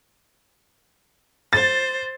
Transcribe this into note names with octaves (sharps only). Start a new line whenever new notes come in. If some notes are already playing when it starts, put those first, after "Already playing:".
C5 A6